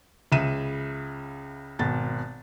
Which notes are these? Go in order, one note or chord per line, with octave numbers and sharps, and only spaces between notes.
C#2 C#3 E5 D#7 E7
G#1 B2 A6